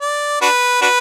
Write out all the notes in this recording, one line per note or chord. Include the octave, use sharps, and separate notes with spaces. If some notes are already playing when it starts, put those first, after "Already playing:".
D5
D4 F#4 B4
D4 F#4 B4